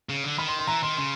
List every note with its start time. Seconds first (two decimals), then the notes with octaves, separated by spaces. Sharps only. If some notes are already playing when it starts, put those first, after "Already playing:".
0.09 C#3
0.24 D3
0.38 D#3 B5
0.48 C6
0.59 C6
0.68 E3 A#5
0.83 D#3 C6
0.97 C#3 C6